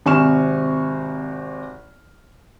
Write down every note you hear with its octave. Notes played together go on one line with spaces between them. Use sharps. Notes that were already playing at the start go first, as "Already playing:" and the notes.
G#1 C3 G#5 C#6 F6 E7